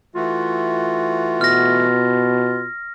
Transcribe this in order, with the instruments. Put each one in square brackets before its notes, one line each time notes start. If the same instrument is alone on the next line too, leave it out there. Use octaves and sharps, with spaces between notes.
[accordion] E3 A3 F#4 [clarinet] F4
[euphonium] B2 [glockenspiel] F6 A#6